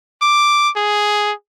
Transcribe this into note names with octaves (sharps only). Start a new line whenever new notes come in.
D6
G#4